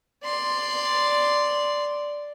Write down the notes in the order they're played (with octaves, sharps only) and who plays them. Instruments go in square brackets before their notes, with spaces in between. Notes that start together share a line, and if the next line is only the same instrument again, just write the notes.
[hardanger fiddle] D5 C6